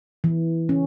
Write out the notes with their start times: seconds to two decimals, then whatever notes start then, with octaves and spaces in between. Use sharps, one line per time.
0.24 E3
0.69 C#4